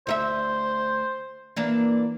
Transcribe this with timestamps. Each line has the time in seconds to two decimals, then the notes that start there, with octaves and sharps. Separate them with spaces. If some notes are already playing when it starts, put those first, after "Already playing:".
0.07 D2 D#4 C5 E5
1.56 E3 A#3 D4